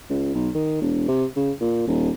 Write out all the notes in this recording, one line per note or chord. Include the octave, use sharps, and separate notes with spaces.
C#2
B1
D#3
E1
C3
C#3
A#2
D#1